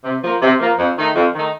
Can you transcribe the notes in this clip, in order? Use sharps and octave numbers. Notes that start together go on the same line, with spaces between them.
C3
F3 A#3
C3
F3 A#3
F2
D#3 A3 D#4
F2
D#3 A3 D#4